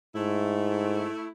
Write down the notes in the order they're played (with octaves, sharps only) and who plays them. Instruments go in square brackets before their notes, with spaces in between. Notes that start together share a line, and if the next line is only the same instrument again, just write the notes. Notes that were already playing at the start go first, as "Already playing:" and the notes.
[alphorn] G#2 [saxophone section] A3 E4